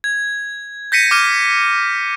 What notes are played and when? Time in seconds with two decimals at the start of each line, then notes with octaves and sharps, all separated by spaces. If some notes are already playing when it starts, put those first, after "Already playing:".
0.04 G#6
0.92 G6 A#6 B6 C#7 D#7
1.11 D6 F6 D#7